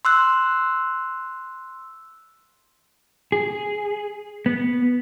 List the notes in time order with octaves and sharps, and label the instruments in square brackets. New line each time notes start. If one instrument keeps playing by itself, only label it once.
[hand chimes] C6 E6 F#6
[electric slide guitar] G#4
B3